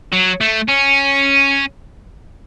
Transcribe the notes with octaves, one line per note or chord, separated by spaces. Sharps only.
F#3
A3
C#4